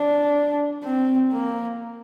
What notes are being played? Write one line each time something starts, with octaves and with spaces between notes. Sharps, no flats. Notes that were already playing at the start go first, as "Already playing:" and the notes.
Already playing: D4
C4
A#3